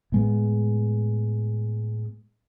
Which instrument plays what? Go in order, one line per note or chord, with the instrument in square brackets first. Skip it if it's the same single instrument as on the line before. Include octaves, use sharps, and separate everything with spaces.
[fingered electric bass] A2 G#3 B3